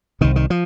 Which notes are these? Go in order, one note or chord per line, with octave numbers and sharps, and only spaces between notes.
C2 C3 D#3
D#3
F3